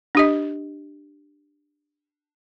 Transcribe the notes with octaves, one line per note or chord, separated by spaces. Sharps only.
D4 G4 D#5